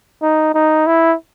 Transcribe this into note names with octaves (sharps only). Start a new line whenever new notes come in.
D#4
D#4
E4